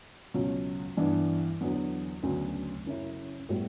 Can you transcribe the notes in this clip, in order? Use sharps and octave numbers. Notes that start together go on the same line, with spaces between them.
C#2 B2 F#3 C#4
G2 E3 B3 D4
E2 D3 F#3 B3
D2 C#3 F#3 B3 D4
F#2 C#3 F#3 C#4 E4
A2 G3 B3